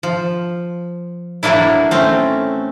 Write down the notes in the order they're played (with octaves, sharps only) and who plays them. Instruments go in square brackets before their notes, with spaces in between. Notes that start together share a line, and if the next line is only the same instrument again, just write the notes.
[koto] F3
A2 E3 F#3 A#3 D4 E4
A3 C4 C#4